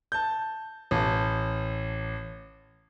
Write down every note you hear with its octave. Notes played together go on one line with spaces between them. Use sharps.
A5 G6
A1 A5